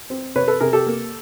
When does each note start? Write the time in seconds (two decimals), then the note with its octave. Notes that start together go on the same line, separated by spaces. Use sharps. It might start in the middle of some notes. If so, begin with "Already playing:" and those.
0.10 C4
0.36 C3 B4 C#5
0.48 A4 B4
0.60 C3 G#4 A#4
0.73 G4 A4
0.86 A#3